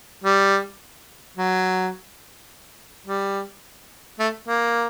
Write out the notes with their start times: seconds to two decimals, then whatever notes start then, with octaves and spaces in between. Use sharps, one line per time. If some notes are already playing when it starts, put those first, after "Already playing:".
0.24 G3
1.37 F#3
3.07 G3
4.19 A3
4.48 A#3